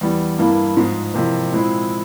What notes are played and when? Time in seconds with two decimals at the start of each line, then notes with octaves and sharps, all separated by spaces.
0.01 E2 E3 G3
0.39 G2 E3 A#3 E4
0.77 G#2 F3 G#3
1.14 F2 C3 E3 A#3
1.52 A#2 G#3 C4 E4